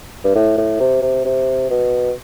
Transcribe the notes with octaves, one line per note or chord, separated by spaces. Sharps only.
G2
A2
A2
C3
C3
C3
B2